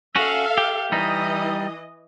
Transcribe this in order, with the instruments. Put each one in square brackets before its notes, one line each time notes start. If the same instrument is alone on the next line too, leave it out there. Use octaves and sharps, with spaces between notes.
[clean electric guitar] C#4 F#4 [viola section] A4 E5 F5
[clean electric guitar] G4
[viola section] E3 D#5 [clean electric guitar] G3 D#4